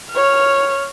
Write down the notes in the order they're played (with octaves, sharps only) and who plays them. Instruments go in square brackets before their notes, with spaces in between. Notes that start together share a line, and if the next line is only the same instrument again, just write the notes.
[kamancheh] C#5 F6